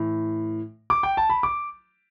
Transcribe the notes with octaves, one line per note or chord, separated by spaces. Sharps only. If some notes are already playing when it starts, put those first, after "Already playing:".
Already playing: A2 E3
D6
G5
A5
B5
D6